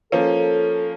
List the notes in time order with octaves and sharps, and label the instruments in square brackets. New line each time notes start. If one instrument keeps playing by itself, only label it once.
[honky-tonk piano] F3 A#3 C#4 [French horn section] A4